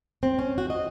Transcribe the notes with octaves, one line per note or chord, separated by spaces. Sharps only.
C4
C#4
F#4
D#5